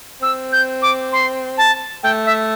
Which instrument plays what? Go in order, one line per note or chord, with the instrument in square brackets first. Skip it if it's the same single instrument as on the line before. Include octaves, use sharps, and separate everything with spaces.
[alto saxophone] C4 [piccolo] E6
[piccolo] G6
D6
C6
A5
[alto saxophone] A3 [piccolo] G5
[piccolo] E5